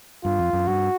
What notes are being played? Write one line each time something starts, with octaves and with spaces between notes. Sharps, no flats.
G2 F4
F2
F#2
G2 F#4